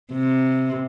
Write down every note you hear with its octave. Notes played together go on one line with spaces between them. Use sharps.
C3